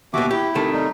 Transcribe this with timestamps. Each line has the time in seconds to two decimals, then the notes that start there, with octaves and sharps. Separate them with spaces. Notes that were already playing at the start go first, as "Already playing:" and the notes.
0.14 D#2 B2 F#4 E5 D6
0.31 E4 G4
0.55 C3 D#3 A3
0.72 G3 D#4